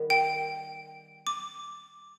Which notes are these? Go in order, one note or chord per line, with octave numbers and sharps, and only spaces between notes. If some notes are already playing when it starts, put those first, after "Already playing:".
Already playing: D#3 G3 B3
G5
D6